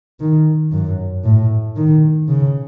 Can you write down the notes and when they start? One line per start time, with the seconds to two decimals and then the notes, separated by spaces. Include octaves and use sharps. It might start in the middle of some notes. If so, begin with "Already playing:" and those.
0.20 D#3
0.72 F#2
1.24 A2
1.76 D#3
2.28 C#3